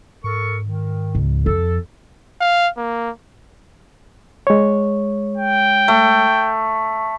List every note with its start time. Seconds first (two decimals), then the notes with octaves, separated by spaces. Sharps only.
0.24 G#2 A4 A#4 C#6
0.66 D#3
1.15 C#2
1.46 F2 A4
2.41 F5
2.77 A#3
4.47 G#3 C#5
5.37 G5
5.88 A3